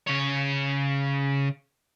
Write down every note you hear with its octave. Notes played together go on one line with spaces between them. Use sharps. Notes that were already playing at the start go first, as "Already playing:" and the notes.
C#3 C#5